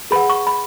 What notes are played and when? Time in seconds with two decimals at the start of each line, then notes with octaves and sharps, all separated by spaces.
0.11 G#4 B4 F#5 B5
0.30 C#6
0.47 B5